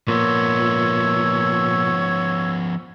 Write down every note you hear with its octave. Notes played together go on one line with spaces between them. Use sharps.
A#2 F3 B3 C#5 E6